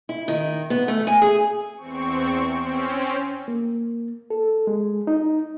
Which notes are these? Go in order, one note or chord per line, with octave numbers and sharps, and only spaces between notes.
E4
D#3
B3
A3
G#5
G#4
E2 C4 C#6
C4 C#4
A#3
A4
G#3
D#4